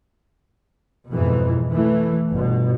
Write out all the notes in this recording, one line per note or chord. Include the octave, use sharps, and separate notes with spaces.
F2 G#2 B2 E3
E3 A3
G1 B2